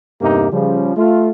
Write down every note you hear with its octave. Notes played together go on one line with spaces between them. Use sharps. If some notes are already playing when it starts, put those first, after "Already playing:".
E2 G2 C3 A#3 D#4 G4
C#3 F3 G3
A3 F4